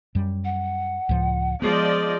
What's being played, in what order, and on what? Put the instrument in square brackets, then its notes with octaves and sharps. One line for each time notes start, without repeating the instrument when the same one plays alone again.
[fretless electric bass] F#2 G3
[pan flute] F#5
[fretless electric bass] C#2 A2 F3
[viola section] F3 D5 D#5 [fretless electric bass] G#3 B3 [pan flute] G#4